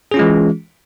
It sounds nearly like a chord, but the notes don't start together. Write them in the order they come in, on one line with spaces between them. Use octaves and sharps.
G#4 C#4 F4 G#3 E3